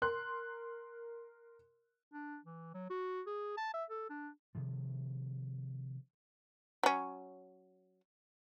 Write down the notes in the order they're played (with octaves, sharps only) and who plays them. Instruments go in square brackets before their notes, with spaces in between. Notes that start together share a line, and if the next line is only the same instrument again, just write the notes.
[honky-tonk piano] A#4 C6 F#6
[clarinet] D4
E3
F#3
F#4
G#4
A5
E5
A4
D4
[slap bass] C3 D#3 F3
[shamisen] F#3 C#4